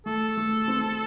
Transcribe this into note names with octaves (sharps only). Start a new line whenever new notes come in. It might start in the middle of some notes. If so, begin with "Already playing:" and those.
A3 A4
A3
C4